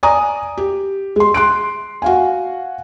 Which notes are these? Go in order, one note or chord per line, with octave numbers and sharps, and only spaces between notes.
D5 G#5 A#5 D#6
G4
G#3 C6
C6 F#6 D7
F#4 F5 G#5